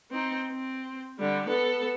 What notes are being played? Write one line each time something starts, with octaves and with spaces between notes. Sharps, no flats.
C4 D#4
C4
D3 G3
B3 A4